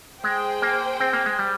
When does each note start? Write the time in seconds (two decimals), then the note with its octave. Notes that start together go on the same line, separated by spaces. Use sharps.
0.24 G#3 G#4 C5 G5
0.62 A#3
1.00 C4
1.13 A#3
1.26 G#3
1.39 G3